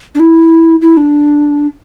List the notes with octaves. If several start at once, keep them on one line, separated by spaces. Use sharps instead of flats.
D4
E4
E4
D4